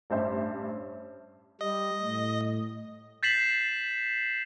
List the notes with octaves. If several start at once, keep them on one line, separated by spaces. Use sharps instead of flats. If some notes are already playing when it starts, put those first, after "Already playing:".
A1 G2 C5 E5
G3 D#5
A2
G6 A6 B6 C7 E7 F#7